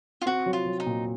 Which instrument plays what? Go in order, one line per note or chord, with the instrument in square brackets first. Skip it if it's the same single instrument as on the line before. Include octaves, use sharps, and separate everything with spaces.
[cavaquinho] F4
[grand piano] C4 [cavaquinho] F#4
[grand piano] F#3
[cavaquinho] F4
[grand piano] F#3
[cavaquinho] D#4
[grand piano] A#2